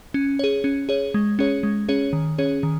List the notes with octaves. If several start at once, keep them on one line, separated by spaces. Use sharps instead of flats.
C#4
G#4 C#5
C#4
G#4 C#5
G#3
C#4 G#4 C#5
G#3
C#4 G#4 C#5
D#3
C#4 G#4 C#5
D#3